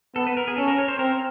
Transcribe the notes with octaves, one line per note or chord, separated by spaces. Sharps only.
B3 A4
B4
A#4
G#4
C#4 A4
A#4
C#5
C5
C4 A#4